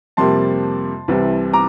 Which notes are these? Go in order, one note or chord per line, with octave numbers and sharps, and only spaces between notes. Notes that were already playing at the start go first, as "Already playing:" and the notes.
F2 C3 G3 A#3 A5 C6
C2 C3 E3 G3
A#5 D6